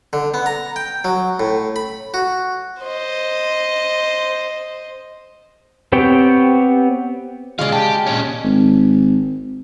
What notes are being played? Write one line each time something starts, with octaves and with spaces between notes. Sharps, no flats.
D3
B3
A#5
G5
F#3
A2
B5
F#4
C5 D#5
B3 C4 G4 C#5 G5
C#3 G#3 D5 F5
G4 A5
A#2 C#4
G#1